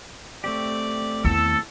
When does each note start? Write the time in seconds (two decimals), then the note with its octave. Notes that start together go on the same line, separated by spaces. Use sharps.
0.44 A3 C4 G4 D5
1.25 E2 D#3 A4 E6